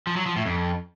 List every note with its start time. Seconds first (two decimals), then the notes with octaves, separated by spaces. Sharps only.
0.07 F3
0.16 F#3
0.26 F3
0.36 A2
0.45 F2